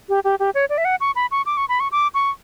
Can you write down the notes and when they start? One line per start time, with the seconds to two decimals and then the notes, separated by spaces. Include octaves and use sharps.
0.09 G4
0.25 G4
0.40 G4
0.55 C#5
0.70 D5
0.78 E5
0.85 F#5
1.01 C#6
1.16 B5
1.31 C#6
1.46 D6
1.57 C#6
1.69 B5
1.80 C#6
1.92 D6
2.14 C#6